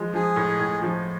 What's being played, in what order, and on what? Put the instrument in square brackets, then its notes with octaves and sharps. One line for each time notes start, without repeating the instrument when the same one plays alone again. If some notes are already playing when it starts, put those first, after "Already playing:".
Already playing: [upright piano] F3 G#3
[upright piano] F3 [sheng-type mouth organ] G#4
[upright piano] A2
A2
F3